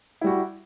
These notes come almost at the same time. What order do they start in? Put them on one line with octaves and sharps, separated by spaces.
E4 G3 F#4